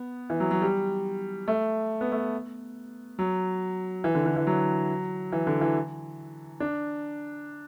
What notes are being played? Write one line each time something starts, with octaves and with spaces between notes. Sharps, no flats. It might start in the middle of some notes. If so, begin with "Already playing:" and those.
Already playing: B3
E3
F#3
F#3
G3
A3
B3
A3
F#3
E3
D3
D3
E3
F#3
E3
D3
E3
D4